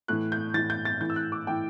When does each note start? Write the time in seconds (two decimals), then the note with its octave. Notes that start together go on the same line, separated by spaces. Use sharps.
0.08 A2 E3 F#6
0.32 G6
0.54 E3 A6
0.57 A2
0.70 G6
0.85 A6
1.01 A2 E3 G6
1.10 E6
1.16 F#6
1.32 D6
1.46 A2 E3 G5